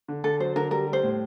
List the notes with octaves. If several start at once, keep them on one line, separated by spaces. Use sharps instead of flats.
D3
D3 A4
F#3 C5
D3 A#4
G3 A#4
G3
C5
A2